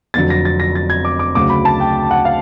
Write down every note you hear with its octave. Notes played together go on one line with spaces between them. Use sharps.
F1 F2 D3 F#3 A6
A#6
A6
A#6
A6
G#6
D6
D6
D2 C#3 F#3 D6
B5
A5
G5
F#5
F5